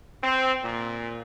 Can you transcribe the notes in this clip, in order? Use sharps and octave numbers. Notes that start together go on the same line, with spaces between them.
C4
A#2